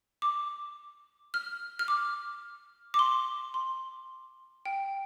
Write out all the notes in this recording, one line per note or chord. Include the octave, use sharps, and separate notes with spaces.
D6
F6
F6
D6
D6
C6
C6
G5